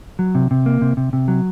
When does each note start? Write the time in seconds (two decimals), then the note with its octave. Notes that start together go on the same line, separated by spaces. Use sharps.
0.19 F#3
0.35 C3
0.51 C3
0.66 A#3
0.82 C3
0.97 C3
1.13 C3
1.28 F#3